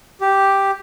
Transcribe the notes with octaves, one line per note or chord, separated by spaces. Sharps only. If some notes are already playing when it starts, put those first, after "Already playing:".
G4